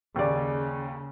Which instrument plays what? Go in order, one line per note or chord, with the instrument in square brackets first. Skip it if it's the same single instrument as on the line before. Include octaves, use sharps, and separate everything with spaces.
[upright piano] D#2 D5 [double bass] C#3